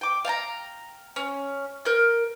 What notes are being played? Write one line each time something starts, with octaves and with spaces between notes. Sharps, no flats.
G5 D6
F5 G5 A5 A#5
C#4
A#4 G6